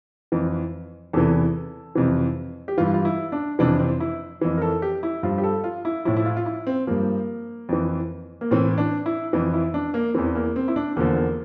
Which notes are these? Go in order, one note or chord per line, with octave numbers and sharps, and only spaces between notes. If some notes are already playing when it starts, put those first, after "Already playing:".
F2 E3
E2 C3 E3 A4
F2 C3 E3
G4
G2 E3 F4
F4
E4
D4
F2 C3 E3 D4
C4
E4
F2 E3
A#4
A4
G4
E4
G2 F3 F4
G4
A4
F4
E4
A2 F3 E4
E4
F4
F4
E4
C4
G2 F3 A#3
F2 E3
A#3
A2 E3 C4
D4
E4
F2 E3
E4
D4
A#3
E2 E3 C4
A#3
C4
E4
D4
E2 D3 F3 A#3
A#3